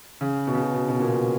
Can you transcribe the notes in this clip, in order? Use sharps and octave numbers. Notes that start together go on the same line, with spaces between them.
C#3
B2
C#3
B2
B2
B2
A#2